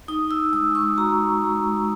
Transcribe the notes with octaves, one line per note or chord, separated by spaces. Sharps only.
D#4 D#6
E6
G#3 D#6
C#6
F#4 A#5
G#3